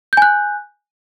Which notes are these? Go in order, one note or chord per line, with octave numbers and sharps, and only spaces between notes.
G#5 F#6 G6